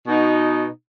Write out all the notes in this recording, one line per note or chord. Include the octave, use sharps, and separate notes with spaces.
B2 D#4